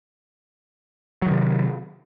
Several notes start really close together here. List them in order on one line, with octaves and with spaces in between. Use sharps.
F#3 D#3 C3